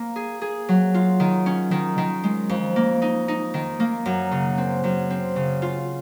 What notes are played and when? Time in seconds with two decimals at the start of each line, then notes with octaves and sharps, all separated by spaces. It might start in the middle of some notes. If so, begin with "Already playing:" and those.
Already playing: A#3
0.16 G#4
0.42 G#4
0.68 F#3
0.94 F4
1.20 D#3
1.46 C#4
1.71 D#3
1.98 D#3
2.24 G#3
2.49 F2
2.76 A#3
3.02 D#4
3.28 D#4
3.54 D#3
3.80 A#3
4.06 F#2
4.31 C#3
4.58 C4
4.84 F#2
5.10 C4
5.36 C#3
5.62 F4